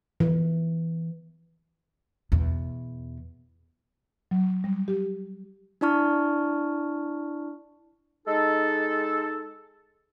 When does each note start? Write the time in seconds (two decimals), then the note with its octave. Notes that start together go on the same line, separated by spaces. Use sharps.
0.20 E3
2.32 E2 B2
4.31 F#3
4.64 G3
4.88 G4
5.81 D4 E4 D5 A5 C#6 F6
8.27 G#3 D#4 A4